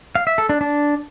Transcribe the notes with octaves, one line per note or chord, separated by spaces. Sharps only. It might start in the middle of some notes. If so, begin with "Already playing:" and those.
F5
E5
A4
D4
D4